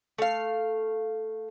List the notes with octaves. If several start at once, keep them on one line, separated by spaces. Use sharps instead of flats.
A3 F5